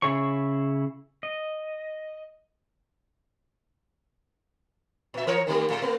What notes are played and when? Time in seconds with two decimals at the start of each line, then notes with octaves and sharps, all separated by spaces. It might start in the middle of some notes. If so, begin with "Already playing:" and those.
0.02 C#3 E4 G#4 C#5 C#6
1.23 D#5
5.14 A#2 E5
5.27 E3 A#4 C#5
5.47 D#3 G3 A3
5.70 A#2 G#3 A#3
5.82 A3 B3